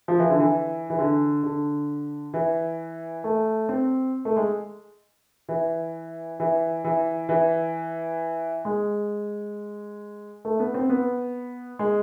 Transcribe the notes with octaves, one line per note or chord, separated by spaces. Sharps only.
F3
E3
D3
E3
E3
D3
D3
E3
A3
C4
A3
G#3
E3
E3
E3
E3
G#3
A3
B3
C4
B3
G#3